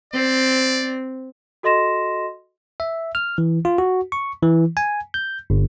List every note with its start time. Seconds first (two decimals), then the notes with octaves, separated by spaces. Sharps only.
0.14 C4 D5
1.63 F#4 A4 D#5 C6 A#6 E7
2.80 E5
3.15 F6
3.38 E3
3.65 F4
3.78 F#4
4.12 C#6
4.42 E3
4.77 G#5
5.14 G6
5.50 G1